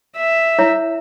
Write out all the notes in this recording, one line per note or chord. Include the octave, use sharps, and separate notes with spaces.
E5
E4 C#5 A#5